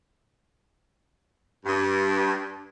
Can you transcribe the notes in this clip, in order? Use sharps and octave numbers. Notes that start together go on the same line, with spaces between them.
G2